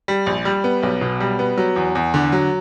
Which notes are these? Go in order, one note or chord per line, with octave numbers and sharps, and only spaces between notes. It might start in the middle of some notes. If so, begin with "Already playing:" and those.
G3
A#1
G3
B3
B1
B2
G3
B3
F#3
E2
E2
D3
F#3